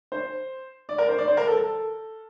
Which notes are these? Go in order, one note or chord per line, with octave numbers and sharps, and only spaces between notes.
C5
D5
A#4
C5
D5
C5
A#4
A4
A4